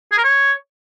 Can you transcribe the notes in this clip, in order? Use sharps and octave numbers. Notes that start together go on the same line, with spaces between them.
G#4
A#4
C#5